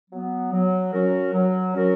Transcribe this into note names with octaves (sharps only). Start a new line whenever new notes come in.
F#3 B3
F#3
C#4 F#4 A#4
F#3
C#4 F#4 A#4